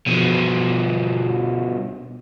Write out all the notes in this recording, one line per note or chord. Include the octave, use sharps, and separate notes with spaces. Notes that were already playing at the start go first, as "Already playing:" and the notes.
B2 F3